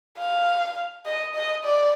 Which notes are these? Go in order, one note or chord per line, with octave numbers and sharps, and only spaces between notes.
F5
D#5
D#5
D5